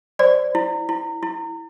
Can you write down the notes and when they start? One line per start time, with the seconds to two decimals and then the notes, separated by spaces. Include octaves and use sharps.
0.19 C5 D5
0.55 E4
0.89 E4
1.23 E4